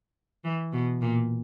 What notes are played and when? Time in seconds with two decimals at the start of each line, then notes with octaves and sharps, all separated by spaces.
0.44 E3
0.73 B2
1.02 A#2